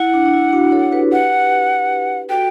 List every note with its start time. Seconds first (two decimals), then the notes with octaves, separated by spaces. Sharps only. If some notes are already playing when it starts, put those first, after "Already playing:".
Already playing: E4 F#5
0.14 D4
0.25 D4
0.33 E4
0.52 D4 F#4
0.72 A4 C#5
0.92 G4 B4
1.12 F#5
2.29 F#4 A4 G5